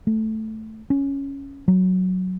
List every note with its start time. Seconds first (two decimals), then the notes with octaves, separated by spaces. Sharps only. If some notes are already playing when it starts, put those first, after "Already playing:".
0.07 A3
0.90 C#4
1.68 F#3